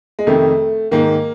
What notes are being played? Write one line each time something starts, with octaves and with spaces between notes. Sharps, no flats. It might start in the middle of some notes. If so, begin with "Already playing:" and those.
G#3
F2 C3 D#3 A3
G#2 D#3 A#3